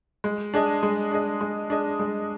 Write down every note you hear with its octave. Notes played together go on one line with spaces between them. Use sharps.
G#3
D4 G#4 D#5
G#3
D4 G#4 D#5
G#3
D4 G#4 D#5
G#3